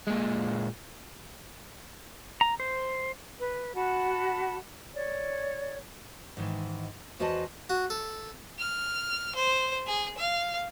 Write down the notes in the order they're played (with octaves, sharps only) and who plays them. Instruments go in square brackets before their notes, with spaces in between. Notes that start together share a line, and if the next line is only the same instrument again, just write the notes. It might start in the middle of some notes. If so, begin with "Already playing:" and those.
[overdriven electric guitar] A#2 G#3
[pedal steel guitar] A#5
C5
[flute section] B4
F#4 F#5 A5 B5
C#5 D5
[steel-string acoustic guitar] G#2 D#3 E3
E2 F#4 B4 C5 D#5 A5
[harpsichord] F#4
A4
[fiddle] F6
C5
G#4
F5